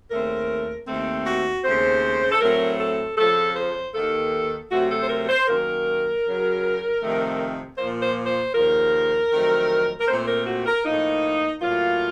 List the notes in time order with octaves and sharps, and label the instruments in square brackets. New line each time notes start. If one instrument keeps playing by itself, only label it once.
[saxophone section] D#2 C#3 A3 C4 A#4
D#2 D#3 A3 C4
F#4
D#2 C#3 A3 C4 C5
A4
A2 F#3 A3 C4 A#4
A4
F2 C#3 F3 A4
C5
D#2 D#3 A#3 A4
C3 F#3 A3 C4 F#4
A4
C5
A#4
C5
F#2 D#3 A#3 A#4
F#2 C#3 F#3
F2 C3 D#3 A3
A#2 F3 A#3 C5
C5
C5
D#2 C#3 F3 A#4
F2 D#3 F#3 A3 C4
A#4
A#2 A3 C4 C5
C5
A#4
F#4
A#4
A2 F3 A#3 D#4
A2 F#3 A#3 F4